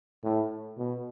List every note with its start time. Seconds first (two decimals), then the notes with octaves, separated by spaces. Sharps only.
0.24 A2
0.78 B2